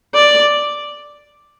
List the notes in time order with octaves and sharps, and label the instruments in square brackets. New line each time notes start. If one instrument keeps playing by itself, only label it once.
[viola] D5